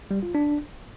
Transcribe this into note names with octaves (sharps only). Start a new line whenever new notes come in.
G3
F4
D4